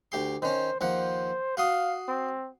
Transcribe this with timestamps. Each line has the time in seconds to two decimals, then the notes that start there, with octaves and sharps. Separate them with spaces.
0.12 D2 G4 C6
0.42 D#3 C#4 C5
0.81 D#2 F3 C5 F#5
1.57 F#4 F5 C6 D#6
2.08 C4